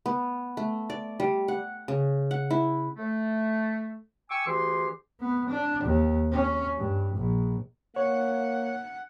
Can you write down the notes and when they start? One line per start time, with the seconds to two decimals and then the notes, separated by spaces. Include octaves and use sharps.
0.06 B3
0.57 A3
0.90 D5
1.20 G3
1.48 F#5
1.88 C#3
2.31 F#5
2.50 E4
2.97 A3
4.29 G5 G#5 C#6 D6 E6
4.46 D2 E3 G4 G#4 C6
5.20 B3
5.49 D4
5.84 D#2
6.32 C#4
6.78 G2
7.16 A#1
7.96 A#3 C#5 F#5